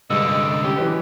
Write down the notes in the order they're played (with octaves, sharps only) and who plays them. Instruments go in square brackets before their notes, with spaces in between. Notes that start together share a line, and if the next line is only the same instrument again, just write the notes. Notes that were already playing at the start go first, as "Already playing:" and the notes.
[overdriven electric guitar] C2 D3 [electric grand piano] G2 G#3 [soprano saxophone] D#5 [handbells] E6
[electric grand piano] C#4 [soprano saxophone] G4
[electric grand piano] E3 F#3 B4